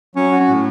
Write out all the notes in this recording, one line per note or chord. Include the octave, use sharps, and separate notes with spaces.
F#3 C#4
F#4
C#4
A2